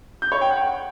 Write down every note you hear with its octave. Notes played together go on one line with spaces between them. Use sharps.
G6
C#5
G5
F#5